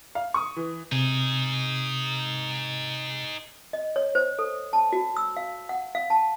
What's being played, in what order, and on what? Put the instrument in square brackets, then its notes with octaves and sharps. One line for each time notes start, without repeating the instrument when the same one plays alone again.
[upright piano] F5
C#6 D#6
E3
[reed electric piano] C3 [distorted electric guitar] D#4 G#4
[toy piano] D#5
C#5
C5
A4
A5
F#4
E6
F5
F#5
F5
A5